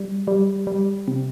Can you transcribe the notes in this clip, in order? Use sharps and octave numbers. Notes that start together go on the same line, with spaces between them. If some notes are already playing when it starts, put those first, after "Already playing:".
Already playing: G3
G3
G3
C3